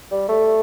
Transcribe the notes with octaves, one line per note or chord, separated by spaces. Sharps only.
G3
A3